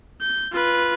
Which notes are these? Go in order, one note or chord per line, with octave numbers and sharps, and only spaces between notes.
G6
F4 B4